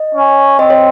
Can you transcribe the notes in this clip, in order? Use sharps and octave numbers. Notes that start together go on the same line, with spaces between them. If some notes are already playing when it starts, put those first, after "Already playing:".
Already playing: D#5
C#4
C4 D#5
C#5